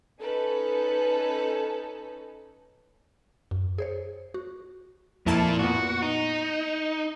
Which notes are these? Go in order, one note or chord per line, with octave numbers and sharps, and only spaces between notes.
C#4 D#4 A4 B4
F#2
G#4 C5 C#5
F#4
F2 A#2 A#3 E4 A5
A#2 B3 F#4
D#4